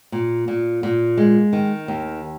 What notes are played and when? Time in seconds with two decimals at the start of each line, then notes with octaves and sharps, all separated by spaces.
0.12 A#2
0.48 A#2
0.83 A#2
1.18 G#3
1.53 D#3
1.88 D#2